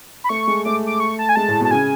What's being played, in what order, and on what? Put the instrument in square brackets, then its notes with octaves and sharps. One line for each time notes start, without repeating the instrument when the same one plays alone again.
[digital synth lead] B5
[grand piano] A3 [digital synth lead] C#6
[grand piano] G#3
[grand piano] A3 [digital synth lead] D6
[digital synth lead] D6
C#6
A5
G#5
[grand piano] G#3 [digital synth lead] A5
[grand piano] A2
[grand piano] B2 [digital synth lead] A5
[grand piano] C#3 [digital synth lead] G#5